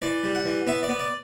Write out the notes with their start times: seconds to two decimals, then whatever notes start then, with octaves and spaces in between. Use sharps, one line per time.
0.02 E3 D5
0.24 G3
0.35 F#5
0.45 E3
0.67 B3 E5
0.83 D5
0.89 B3
0.99 D5